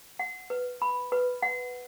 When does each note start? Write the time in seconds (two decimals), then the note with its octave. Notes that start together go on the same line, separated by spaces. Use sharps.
0.19 F#5
0.50 B4
0.82 B5
1.12 B4
1.42 F#5